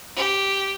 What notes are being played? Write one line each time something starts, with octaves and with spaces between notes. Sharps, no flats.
G4